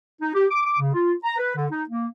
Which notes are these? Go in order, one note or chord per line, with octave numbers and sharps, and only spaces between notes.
D#4
G4
D6
D6
C#3
F4
A#5
B4
D3
D#4
A#3